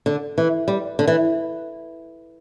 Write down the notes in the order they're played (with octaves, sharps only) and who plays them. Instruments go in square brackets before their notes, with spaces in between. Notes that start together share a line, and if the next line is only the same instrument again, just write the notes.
[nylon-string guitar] D3
E3
G3
D3
E3